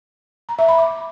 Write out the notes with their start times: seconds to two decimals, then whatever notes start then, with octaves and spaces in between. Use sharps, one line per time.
0.49 A#5
0.59 E5
0.68 B5
0.78 D6